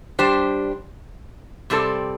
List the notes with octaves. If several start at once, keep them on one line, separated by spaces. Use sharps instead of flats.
G3 D4 G4 C5
C3 G3 C4 A4 D5